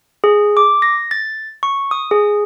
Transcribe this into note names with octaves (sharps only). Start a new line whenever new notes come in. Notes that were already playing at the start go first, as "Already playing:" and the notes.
G#4
D6
A#6
A6
C#6
D#6
G#4